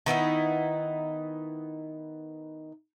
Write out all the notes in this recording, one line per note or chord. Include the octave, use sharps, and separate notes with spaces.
D#3 B3 D#4 E4